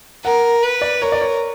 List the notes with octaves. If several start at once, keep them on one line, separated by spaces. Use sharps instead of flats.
A#4 F#5
B4
D5
A#4 C#5
D5
C#5